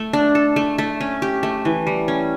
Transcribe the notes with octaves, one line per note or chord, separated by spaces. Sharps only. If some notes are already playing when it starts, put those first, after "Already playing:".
Already playing: A3
D4
A4
A3
A3
C#4
G4
A3
E3
G3
C#4